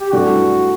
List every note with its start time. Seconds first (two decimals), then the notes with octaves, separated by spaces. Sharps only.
0.01 G4
0.12 G2 E3 A3 D4 F#4 A4